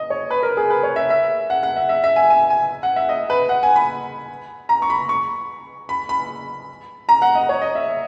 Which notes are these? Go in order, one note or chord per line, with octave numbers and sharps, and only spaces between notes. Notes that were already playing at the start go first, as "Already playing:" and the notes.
Already playing: D#5
C#5
B4
A#4
G#4
B4
C#5
E5
E5
F#5
F#5
E5
E5
E5
G#5
G#5
G#5
F#5
E5
D#5
B4
F#5
G#5
B5
A#5
C#6
B5
C#6
B5
B5
A#5
F#5
D#5
C#5
D#5
E5